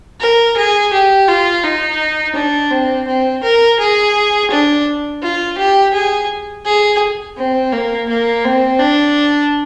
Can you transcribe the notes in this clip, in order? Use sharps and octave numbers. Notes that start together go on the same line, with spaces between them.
A#4
G#4
G4
F4
D#4
D4
C4
C4
A#4
G#4
D4
F4
G4
G#4
G#4
C4
A#3
A#3
C4
D4